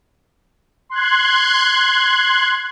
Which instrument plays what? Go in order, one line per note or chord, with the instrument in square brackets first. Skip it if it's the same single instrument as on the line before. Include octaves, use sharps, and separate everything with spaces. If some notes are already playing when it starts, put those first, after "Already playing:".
[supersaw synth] C6 F#6 G#6